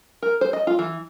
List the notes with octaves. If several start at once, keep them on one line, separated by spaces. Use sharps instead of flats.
A#4
C5
D#5
F4
E3